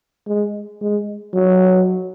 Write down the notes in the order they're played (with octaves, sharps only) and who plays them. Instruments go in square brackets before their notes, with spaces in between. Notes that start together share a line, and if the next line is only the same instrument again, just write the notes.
[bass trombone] G#3
G#3
F#3